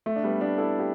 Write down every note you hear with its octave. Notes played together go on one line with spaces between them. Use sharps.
A3
D4
G3 B3
A3 D4
E4 A4
G4